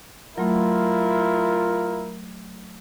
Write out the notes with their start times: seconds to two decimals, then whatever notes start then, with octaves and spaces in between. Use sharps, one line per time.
0.38 F#3 A3 E4 F4 A#4